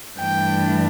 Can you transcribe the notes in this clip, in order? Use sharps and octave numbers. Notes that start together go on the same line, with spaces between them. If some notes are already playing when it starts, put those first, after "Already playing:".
G2 E3 A3 D4 G5